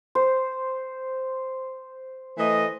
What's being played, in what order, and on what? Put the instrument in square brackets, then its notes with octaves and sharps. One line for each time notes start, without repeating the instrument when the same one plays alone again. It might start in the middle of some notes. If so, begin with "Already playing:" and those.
[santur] C5
[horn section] E3 A3 D#5